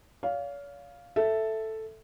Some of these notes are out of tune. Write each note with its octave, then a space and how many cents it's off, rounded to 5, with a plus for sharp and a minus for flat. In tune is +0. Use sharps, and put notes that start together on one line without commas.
C#5 +45 F5 +0
A4 +0 E5 +0